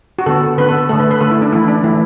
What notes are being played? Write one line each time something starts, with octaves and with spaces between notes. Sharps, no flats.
F#4
D3 B3 A4
D3 B3 B4
A4
D3 A3 A4
B4
B4
D3 A3 A4
E4
D4
E3 A3 E4
D4
E3 A3 E4